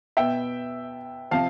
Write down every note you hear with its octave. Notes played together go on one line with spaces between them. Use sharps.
B2 B3 E5 G5
C3 F3 C4 F5 A5